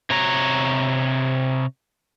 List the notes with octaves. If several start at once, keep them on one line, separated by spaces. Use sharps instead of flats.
C3 C#5 A#5